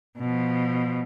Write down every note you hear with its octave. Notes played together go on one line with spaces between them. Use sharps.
B2 F3